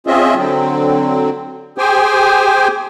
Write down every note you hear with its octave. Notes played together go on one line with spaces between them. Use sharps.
C4 C#4 F4 G#4 D#5 E5
D3 F#3 C4
G4 G#4 C5 G5 G#5